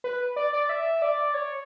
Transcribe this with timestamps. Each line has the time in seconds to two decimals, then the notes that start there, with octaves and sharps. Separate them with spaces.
0.04 B4
0.36 D5
0.53 D5
0.69 E5
1.02 D5
1.34 C#5